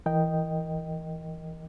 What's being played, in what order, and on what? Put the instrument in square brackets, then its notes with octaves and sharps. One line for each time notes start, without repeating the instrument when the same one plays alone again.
[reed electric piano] E3 A#4 D#5 G5